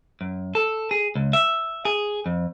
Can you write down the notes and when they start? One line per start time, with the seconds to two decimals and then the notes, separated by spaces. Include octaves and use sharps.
0.21 F#2
0.55 A4
0.91 G#4
1.15 C#2
1.33 E5
1.85 G#4
2.26 F2